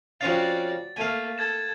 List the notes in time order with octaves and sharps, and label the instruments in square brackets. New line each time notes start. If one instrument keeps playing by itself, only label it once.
[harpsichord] F2 C#4 F5 [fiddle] F#4 D5 [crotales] A6
[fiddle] A3 A#3 [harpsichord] F5 G#5
[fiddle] A4 [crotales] G#6 A6 E7